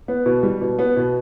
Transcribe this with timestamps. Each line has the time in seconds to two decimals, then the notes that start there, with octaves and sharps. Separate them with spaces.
0.08 B3
0.26 B2
0.43 G3
0.61 B2
0.79 B3
0.97 B2